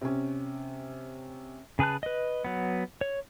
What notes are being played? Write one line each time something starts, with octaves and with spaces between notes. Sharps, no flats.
C3 C#4
C#3 G#4 B4 A5 F#6
B4 D#5
F#3 B3
C#5